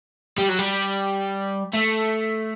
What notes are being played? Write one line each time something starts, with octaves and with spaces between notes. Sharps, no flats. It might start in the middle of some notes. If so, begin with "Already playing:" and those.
G3
F#3
G3
A3